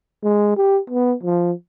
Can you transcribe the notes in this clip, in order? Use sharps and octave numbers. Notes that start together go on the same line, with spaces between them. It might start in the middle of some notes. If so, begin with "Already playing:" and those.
G#3
G4
B3
F3